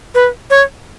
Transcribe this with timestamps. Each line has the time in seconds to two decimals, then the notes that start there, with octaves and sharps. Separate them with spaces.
0.15 B4
0.50 C#5